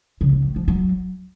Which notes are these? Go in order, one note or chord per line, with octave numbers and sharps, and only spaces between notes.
C#3
C#3
A2
F3
F#3